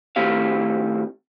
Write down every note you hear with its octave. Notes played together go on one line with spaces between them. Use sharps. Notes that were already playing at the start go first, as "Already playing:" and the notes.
A2 D#3 C4 G4 F5